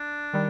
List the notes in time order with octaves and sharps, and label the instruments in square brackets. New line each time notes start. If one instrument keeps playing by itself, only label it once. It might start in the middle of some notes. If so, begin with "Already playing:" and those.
Already playing: [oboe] D4
[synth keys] D#3 G3